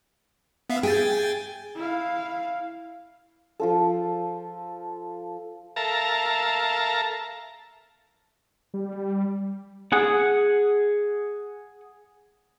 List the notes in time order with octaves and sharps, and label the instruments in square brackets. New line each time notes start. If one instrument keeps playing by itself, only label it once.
[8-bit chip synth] B3 E5 F5
[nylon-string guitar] G#4 [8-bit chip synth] G5 G#5 A6
[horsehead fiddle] E4 F5
[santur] F3 F4 A4
[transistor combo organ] A4 A#4 E5 F5 A5 A#5
[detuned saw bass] G3
[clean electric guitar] G#4 F#5